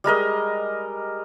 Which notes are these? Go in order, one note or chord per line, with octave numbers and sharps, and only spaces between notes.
G3 G#3 A#4 D#5